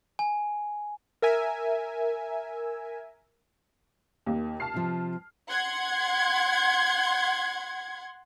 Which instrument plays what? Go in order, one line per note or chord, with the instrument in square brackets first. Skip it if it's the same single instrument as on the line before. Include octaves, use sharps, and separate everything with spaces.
[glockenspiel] G#5
[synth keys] A#4 E5 G#5
[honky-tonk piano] D#2 A#3
A5 F6 C7
[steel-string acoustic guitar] C3 F3
[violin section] F#5 C6 G#6